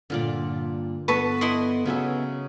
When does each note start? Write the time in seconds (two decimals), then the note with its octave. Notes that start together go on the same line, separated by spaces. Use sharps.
0.10 G2 A#2 D3 F4 D5
1.08 G2 B3 A4 B4 A5 C#6
1.41 E4 D#5 F#5 C6
1.86 C#3 F#3 B3 C#4 E5